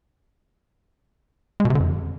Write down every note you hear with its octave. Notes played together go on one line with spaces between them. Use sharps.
G#3
B2
C3
D3
F2